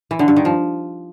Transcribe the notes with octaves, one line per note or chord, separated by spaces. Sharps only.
E3
D3
G2
D#3
F3